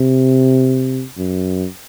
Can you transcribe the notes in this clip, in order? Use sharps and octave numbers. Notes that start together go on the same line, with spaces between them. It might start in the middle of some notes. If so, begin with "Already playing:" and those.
Already playing: C3
F#2